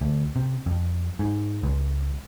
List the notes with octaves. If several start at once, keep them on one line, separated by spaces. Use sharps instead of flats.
D2
C3
F2
G#2
C#2